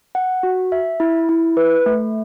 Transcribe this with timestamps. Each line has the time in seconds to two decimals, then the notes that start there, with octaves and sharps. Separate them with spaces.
0.15 F#5
0.43 F#4
0.72 E5
1.00 E4
1.29 E4
1.57 B4
1.86 A3